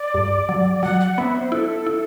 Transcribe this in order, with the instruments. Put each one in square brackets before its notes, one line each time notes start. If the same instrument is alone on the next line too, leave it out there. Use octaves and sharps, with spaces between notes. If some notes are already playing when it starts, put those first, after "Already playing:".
Already playing: [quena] D5
[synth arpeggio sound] G2
F#3
[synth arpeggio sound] F#3 [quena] F#5
[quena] F#5
[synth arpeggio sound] B3 [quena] E5
[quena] C5
[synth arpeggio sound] E4 [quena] A4
[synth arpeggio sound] E4